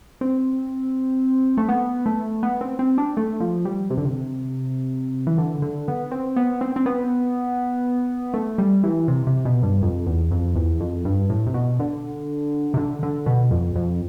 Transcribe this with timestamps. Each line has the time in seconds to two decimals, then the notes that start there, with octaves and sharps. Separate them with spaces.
0.21 C4
1.57 A3
1.68 B3
2.06 A3
2.43 B3
2.61 C4
2.79 C4
2.98 D4
3.17 A3
3.40 F3
3.65 G3
3.90 C3
3.98 D3
4.05 C3
5.27 E3
5.38 D3
5.62 D3
5.88 B3
6.11 C4
6.36 B3
6.61 C4
6.76 C4
6.86 B3
8.34 A3
8.58 G3
8.84 E3
9.08 C3
9.27 C3
9.45 B2
9.63 G2
9.82 F2
10.07 E2
10.31 F2
10.56 E2
10.80 F2
11.05 G2
11.30 A2
11.47 C3
11.54 B2
11.79 D3
12.74 C3
12.77 D3
13.03 D3
13.26 B2
13.51 F2
13.76 F2